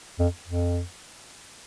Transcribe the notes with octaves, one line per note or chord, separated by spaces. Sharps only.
F2
F2